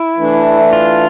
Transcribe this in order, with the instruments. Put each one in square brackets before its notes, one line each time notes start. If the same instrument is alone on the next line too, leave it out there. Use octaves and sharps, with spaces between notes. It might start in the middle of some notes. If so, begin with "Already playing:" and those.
Already playing: [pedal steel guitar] E4
[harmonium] E3 A3 D4
[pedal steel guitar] F4